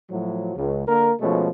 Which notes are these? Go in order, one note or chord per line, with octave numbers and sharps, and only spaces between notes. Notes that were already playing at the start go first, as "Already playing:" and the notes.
A2 F3 F#3
C#2
D3 A#3 A#4
B2 F3 G#3 A3 C#4